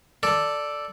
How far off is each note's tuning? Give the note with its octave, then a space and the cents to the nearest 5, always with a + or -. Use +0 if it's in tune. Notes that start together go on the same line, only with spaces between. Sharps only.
A4 +5 D5 +0